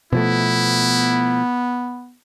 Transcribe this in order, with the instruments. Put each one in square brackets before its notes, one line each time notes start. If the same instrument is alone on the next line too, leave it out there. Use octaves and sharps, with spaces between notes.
[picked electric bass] B2 F3 A3 [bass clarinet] B3 [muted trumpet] E4